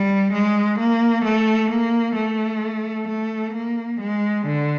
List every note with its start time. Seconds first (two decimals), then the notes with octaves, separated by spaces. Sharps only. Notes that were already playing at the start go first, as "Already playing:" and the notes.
Already playing: G3
0.33 G#3
0.79 A#3
1.24 A3
1.70 A#3
2.16 A3
3.08 A3
3.54 A#3
4.01 G#3
4.46 D3